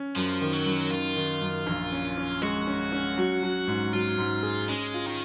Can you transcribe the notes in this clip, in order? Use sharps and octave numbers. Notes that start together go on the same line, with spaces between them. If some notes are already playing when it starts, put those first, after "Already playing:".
Already playing: C#4
F#2 F3
D#3
F#3
F#2
D#3 F4
D#3
F#2
A#1
C#4
C#4
G#3 F#4
C#4
C#4
F#3
F#3
G#2
F#3 F4
G#2
G#4
G#3 C#4
F4
D#3